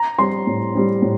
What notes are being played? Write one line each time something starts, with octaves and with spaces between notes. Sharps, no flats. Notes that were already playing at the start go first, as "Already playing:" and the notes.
Already playing: A#5
G3 C4 C6
A2
G3 C4
A2